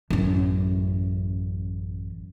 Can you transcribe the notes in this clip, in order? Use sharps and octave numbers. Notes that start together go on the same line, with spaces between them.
A1 F#2